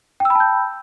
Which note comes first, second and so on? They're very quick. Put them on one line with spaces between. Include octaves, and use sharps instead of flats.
G5 E6 B5 A5 G6